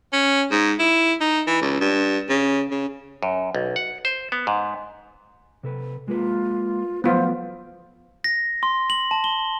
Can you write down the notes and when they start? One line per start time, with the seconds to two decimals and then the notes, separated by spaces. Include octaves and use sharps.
0.13 C#4
0.51 G#2
0.79 E4
1.21 D#4
1.47 E3
1.61 C#2
1.81 G2
2.30 C#3
2.71 C#3
3.23 F#2
3.55 B1
3.76 F#5
4.05 C5
4.32 B3
4.47 G#2
5.63 C3 A4 B4
6.08 G#3 A#3 F4 B4
7.04 F3 F#3 A3 B3 F4 C5
8.24 A#6
8.63 C6
8.90 F#7
9.11 A5
9.24 G7